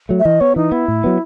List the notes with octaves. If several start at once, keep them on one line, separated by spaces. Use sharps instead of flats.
F#3 A3
E5
E3 D#5
B3 C#5
E3 D#4
B3 E4
A2
F#3 B3